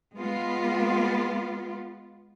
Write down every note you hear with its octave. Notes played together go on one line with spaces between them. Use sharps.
G#3 B3 F4